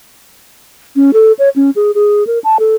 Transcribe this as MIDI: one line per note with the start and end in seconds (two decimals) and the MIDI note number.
0.96 1.11 61
1.13 1.32 69
1.39 1.49 73
1.56 1.70 61
1.76 1.91 68
1.95 2.26 68
2.27 2.39 70
2.44 2.57 81
2.59 2.75 69